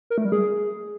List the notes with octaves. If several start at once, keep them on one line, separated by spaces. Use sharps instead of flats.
A#4
A3
G3
G#4